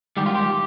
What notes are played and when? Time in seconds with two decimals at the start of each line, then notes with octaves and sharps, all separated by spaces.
0.17 G#2 D#3 G3 G4
0.26 F4
0.35 G4